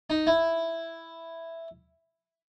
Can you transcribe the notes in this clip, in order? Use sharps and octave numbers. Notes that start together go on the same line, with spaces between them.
D#4
E4